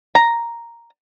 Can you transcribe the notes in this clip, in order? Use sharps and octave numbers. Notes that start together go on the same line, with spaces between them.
A#5